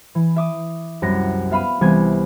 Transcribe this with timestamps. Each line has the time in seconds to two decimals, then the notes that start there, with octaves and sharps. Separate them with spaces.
0.15 E3
0.36 E5 D6 D#6
1.02 C2 F#2 F#5 A#6
1.51 B3 E5 F5 B5 F6 D#7
1.81 C2 E3 B3 G#5 G#6